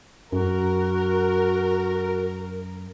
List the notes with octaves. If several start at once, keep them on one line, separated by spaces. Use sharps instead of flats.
F#2 F#4 A#4